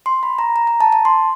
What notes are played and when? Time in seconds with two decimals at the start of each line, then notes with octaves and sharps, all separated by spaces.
0.06 C6
0.23 B5
0.39 A#5
0.56 A#5
0.67 A#5
0.81 A5
0.92 A5
1.05 C6